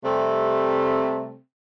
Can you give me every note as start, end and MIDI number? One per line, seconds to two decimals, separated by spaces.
0.04 1.38 48
0.04 1.38 55
0.04 1.38 57
0.04 1.38 60